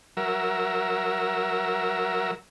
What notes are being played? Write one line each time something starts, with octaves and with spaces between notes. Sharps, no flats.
F#3 A#4 E5